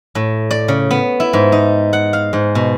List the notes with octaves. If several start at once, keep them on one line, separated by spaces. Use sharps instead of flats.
A2
D5
C#3
B3
E4
G#2
D#4
F#5
F5
G#2
B2